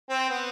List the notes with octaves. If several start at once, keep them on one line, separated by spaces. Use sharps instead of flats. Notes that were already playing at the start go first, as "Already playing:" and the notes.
C4
B3